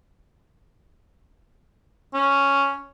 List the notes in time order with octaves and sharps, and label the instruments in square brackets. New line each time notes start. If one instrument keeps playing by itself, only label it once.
[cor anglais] C#4